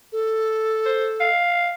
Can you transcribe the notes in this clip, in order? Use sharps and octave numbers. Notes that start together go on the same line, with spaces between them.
A4
C5
F5